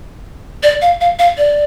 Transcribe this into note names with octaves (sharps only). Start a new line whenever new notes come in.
D5
F5
F5
F5
D5